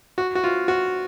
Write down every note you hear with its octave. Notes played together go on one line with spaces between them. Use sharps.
F#4
F#4
F4
F#4